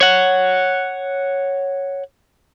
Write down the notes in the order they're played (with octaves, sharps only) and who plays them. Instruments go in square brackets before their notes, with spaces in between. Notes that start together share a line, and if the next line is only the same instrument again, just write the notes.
[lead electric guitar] C#5 F#5